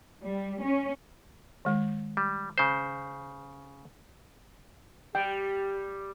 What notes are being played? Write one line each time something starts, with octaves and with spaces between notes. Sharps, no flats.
G3
C#4
D#3 G#3
G3
C#3 C5
G3 G4 G5